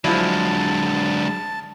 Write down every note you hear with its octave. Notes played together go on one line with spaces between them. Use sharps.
D3 F3 F#3 G#3 E4 A5